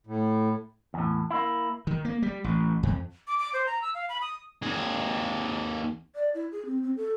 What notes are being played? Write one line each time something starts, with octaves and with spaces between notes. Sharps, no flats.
A2
E2 A2
A#3 E4
D#3
A#3
G3
A1
F2
D6
D6
C5
A#5
E6
F5
B5
D#6
D#2 G#4
D5
E4
G#4
C4
C4
A4